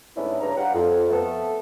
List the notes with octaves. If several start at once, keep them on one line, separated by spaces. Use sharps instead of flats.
G#2 A3 B3 C#4 D4 E4
G2 C#3 B4 C#5 A#5
G3 D4 G4 F5 F#5
F2
A3 B3 A4